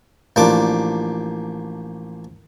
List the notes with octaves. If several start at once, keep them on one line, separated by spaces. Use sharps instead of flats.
A1 F3 A#3 D4 D6